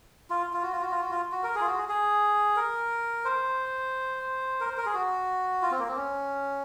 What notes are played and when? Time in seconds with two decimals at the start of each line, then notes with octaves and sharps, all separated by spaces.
0.30 F4
0.53 F4
0.63 F#4
0.72 F4
0.82 F#4
0.91 F4
1.01 F#4
1.11 F4
1.32 F#4
1.43 A#4
1.55 G#4
1.61 F4
1.67 F#4
1.77 G#4
1.89 G#4
2.56 A#4
3.25 C5
4.61 A#4
4.69 C5
4.77 A#4
4.86 G#4
4.94 F#4
5.63 F4
5.71 C4
5.79 A#3
5.88 C4
5.96 C#4